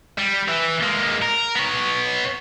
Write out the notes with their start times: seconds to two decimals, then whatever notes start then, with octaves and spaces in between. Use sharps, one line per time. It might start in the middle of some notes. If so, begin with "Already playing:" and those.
0.18 G3
0.48 E3
0.82 G#3 A#3
1.22 A#4
1.55 B3 C#5